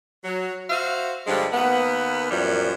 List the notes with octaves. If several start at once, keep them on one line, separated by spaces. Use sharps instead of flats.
F#3
F#4 C5 E5 F5
G2 D3 F3 G3 G#3
D#2 A#3 B3
F#2 A#2 E3 F3 G3